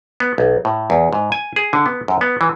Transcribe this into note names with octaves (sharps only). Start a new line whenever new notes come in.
B3
B1
A2
E2
G#2
G#5
G#4
D3
B3
F#2
B3
E3